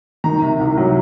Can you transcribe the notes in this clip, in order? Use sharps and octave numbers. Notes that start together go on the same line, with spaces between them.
D#3 A#5
C3
C2
F#3